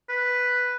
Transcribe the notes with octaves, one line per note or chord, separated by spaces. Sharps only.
B4